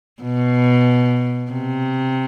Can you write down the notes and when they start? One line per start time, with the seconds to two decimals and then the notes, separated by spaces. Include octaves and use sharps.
0.23 B2
1.51 C3